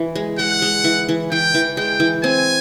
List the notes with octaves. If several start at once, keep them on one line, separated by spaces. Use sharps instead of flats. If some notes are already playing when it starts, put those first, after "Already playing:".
Already playing: E3
G#3
G#3 F#5
G#3
E3
E3
E3 G5
E3
G#3 G5
E3
C4 G#5